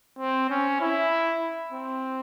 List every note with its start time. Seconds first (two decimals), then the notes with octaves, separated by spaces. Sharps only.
0.19 C4
0.50 C#4
0.81 E4
1.72 C4